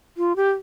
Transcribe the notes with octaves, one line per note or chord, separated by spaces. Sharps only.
F4
G4